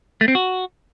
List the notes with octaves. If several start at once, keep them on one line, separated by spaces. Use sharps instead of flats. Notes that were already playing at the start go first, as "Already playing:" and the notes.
A3
C4
F#4